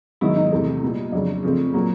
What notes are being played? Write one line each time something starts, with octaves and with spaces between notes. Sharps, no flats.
G#2 D#3 F#3 B3 E4
D#4
E2 C3 E3 A3
A#2 G3 B3
F2 C#3 F#3 D4
C#3 F3 A3 C4
A#2 F#3 A#3